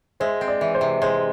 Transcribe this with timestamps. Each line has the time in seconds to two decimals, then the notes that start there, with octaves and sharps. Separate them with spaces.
0.20 G#3 C5 E5
0.41 C4
0.48 D5
0.61 E3
0.75 C5
0.81 C3
1.02 G#3 C5